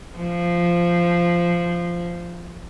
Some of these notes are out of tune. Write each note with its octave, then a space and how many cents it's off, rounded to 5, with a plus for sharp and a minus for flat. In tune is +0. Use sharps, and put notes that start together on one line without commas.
F3 -10